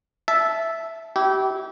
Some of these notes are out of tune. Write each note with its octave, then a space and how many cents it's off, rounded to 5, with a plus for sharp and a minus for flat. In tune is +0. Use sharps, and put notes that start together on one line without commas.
E5 +0 A5 -15
E4 -20 G4 -30